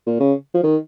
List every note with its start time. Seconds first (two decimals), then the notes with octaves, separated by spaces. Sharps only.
0.06 A#2
0.20 C#3
0.54 F3
0.63 D#3